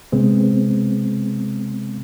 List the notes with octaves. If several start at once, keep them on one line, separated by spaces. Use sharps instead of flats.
C3 G#3 B3 C4